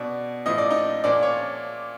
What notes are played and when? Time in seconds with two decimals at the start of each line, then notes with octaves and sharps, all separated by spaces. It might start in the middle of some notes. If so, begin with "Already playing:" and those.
Already playing: B2 D4 D5
0.46 A2 F3 D#5
0.58 D5
0.70 D#4 D#5
1.04 A#2 F3 D4 D5
1.23 C#5